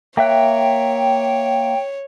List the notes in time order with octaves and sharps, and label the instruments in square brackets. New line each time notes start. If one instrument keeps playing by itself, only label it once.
[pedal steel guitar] A#3 E5 F#6 [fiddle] C#5 [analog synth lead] G5